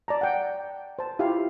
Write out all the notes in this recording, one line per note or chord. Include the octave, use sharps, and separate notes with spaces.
D5 A5 A#5
F#5 G5
C5 A5
E4 F4 G4 F5